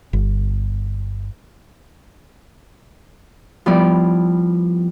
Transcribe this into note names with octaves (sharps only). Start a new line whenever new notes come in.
G1
F3 G3 B3 E4 D5